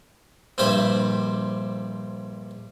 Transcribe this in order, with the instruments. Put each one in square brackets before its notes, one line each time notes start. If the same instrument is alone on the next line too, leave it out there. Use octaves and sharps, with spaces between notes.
[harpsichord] A#1 G2 C4 E4 C5 B5